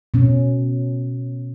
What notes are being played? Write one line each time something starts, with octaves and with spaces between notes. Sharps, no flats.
B2 C#4